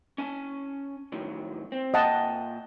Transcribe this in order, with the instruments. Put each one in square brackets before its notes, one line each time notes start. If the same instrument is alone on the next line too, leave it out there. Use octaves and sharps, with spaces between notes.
[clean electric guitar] C#4 G#5 A5
A2 D#3 F#3
C4
[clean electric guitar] A#2 G5 [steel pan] D#5 F#5 A5